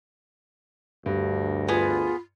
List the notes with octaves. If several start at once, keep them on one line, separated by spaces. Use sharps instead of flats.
D2 G2
B3 F4 G#4